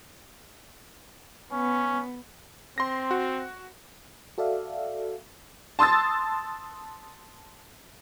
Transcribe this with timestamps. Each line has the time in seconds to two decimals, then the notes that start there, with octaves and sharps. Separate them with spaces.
1.52 B3 C#4
2.78 C4 C6 A#6
3.11 F#4
4.38 F#4 A4 D5 E5 F5
5.79 A5 C6 D#6 E6 A6